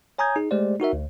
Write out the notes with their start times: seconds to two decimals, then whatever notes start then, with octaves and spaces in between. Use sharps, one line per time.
0.18 C#5 G#5 A#5 D#6 G6 G#6
0.36 D#4 G#4
0.51 G#3 A3 G4 C5 D5
0.80 D#4 F#4 A#4 E5
0.93 D2